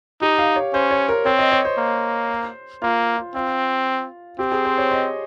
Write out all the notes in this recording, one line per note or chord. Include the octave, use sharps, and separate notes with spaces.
D#4 G4
F5
C#5
C#4 C5
C#5
A#4
C4 C#5
D#5
C#5
C5
A#3
A#3 F4
F4
C4 F4
C4 G4
G#4
C5
C#5
D#5